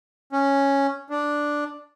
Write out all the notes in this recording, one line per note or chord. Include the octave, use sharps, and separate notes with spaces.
C#4
D4